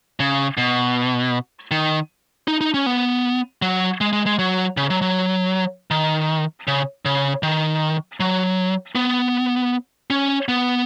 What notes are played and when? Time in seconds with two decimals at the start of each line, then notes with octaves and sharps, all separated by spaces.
0.20 C#3
0.57 B2
1.71 D#3
2.48 D#4
2.61 D#4
2.74 C#4
2.86 B3
3.62 F#3
4.01 G#3
4.13 G#3
4.26 G#3
4.39 F#3
4.77 C#3
4.90 F#3
5.02 F#3
5.91 D#3
6.68 C#3
7.05 C#3
7.43 D#3
8.20 F#3
8.95 B3
10.10 C#4
10.48 B3